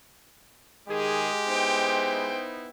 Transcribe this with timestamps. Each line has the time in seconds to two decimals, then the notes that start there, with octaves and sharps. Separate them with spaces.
0.89 D#3 G#3 G4 G#4
1.46 B3 D#4 E4 C5 G5